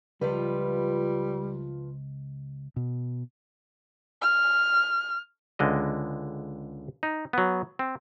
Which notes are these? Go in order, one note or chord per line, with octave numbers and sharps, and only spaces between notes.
C#2 F3 G3 F4 B4
B2
F6
C#2 D3 G#3 D#5
D#4
F#3 B3
C4